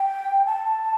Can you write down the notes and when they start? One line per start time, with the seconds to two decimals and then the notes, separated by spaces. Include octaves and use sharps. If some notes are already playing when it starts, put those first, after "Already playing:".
Already playing: G5
0.46 A5